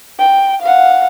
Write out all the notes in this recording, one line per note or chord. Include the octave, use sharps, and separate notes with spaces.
G5
F5 F#5